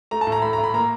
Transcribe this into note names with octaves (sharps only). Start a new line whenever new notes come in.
A3 A#5
A5
A2
A#5
A3 B5
A#5
A2
B5
A#3 A#5